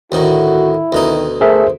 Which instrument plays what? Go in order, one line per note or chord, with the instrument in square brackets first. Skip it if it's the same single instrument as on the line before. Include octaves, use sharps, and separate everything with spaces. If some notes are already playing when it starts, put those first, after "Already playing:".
[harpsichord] D2 A2 D#3 [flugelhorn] E4 [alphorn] F#4
[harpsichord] D2 B2 D#4 [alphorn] D#3
[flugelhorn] A3 [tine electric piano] G#4 A#4 E5 [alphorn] C5